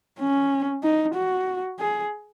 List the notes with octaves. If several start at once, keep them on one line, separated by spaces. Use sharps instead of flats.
C#4
D#4
F#4
G#4